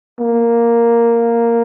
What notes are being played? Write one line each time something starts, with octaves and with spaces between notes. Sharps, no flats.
A#3